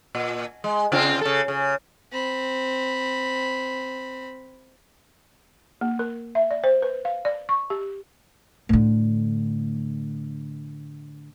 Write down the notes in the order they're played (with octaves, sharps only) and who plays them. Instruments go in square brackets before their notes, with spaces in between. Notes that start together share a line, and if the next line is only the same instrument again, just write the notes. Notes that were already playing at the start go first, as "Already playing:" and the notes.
[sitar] A#2
G#3
C#3 C4 F4
C#3 A4
C#3
[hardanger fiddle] C4 B5
[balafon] A#3
A#4
E5
D5
C5
B4
F5
D5
C#6
G4
[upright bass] A2 D3